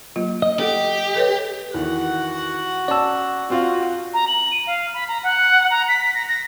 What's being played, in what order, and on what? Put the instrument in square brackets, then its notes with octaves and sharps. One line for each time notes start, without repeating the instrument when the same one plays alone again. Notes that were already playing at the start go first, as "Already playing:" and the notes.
[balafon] F#3 A#3 F4
[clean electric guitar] D#5
[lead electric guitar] G4 [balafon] A4 F#5
[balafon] A4 B4 C#5
[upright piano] E2 D#3 [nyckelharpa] F#4 F#5
[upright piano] C#4 A5 [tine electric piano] D5 E6
[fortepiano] C4 F4 F5 [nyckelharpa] F#4
[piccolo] A#5
F#7
D#7
F5
B5
A#5
F#5
A#5
B6
A#6
A#6